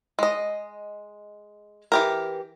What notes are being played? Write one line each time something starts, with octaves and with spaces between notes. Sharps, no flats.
G#3 D#5
E3 G4 A#4